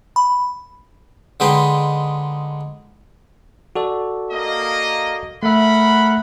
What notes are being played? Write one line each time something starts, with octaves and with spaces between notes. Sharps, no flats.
B5
D3 G#3 D#4 B4 G5 C6
F#4 A4 D5
A#3 D#5
A3 A#4 E5 F#5 B5